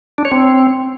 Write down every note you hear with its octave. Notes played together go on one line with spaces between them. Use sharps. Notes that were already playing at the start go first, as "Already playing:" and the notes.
D4
C#5
C4